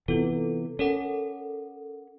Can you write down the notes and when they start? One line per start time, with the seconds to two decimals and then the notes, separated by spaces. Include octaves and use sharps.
0.08 C3 E3 B3 F4 A4
0.79 C#4 A4 A#4 F#5